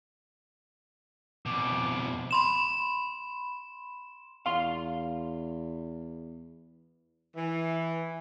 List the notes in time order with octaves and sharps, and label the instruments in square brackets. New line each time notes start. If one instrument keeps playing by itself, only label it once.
[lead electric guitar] F2 B2 [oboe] D6
[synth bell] B5 C6 E7
[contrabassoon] E2 [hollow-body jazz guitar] F5 C6
[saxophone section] E3